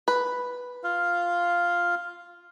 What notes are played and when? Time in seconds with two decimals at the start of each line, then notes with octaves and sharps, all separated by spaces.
0.08 B4
0.84 F4 F5